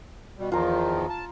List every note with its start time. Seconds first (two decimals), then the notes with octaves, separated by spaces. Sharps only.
0.39 B2 G3
0.52 E2 D#3 F3 F4 A#5
1.09 A5